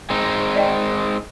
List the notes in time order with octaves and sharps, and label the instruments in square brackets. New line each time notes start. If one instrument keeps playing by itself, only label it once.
[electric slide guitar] G#3 C4 D#4
[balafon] D5 D#5 G5